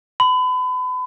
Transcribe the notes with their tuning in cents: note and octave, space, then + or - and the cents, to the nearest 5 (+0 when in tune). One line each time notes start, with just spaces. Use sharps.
B5 +35